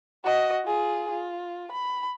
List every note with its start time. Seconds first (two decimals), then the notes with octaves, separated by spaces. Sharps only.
0.24 F#4 D#5
0.65 F4 G#4
1.11 F4
1.72 B5